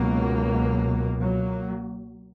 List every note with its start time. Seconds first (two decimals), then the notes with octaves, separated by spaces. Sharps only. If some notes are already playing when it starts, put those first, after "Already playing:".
Already playing: C#2 B2 F#3 A#3
1.21 F#3 A#3